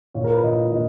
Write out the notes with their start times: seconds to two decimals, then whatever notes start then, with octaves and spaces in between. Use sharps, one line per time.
0.14 A#2 C#5
0.24 A#4
0.34 B4
0.43 A#2 D#5
0.72 A#2 D#5